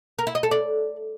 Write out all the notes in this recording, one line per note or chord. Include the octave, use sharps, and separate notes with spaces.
A#4
E4
D#5
A4
D5